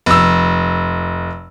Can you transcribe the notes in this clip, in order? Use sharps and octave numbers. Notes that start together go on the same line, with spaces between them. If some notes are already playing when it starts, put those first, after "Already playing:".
F1 E6